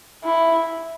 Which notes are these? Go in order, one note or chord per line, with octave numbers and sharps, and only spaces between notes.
E4